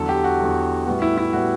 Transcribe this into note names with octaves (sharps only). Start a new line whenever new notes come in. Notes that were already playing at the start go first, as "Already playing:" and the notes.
Already playing: E2 D3 F#3 A4
G4
F#4
E2 D3 F#3
A2 G3 B3 F#4
E4
E4
A2 G3 B3 F#4